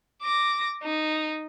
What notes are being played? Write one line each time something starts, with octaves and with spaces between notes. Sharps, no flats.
D6 A#6
D#4